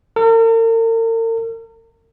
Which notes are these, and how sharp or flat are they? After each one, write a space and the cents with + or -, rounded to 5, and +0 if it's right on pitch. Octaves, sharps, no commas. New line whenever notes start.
A#4 -45